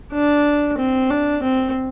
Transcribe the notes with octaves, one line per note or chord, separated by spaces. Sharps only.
D4
C4
D4
C4